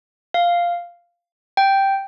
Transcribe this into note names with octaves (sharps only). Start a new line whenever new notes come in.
F5
G5